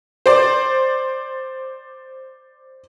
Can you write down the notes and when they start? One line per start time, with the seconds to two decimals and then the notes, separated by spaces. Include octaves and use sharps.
0.26 C5 D5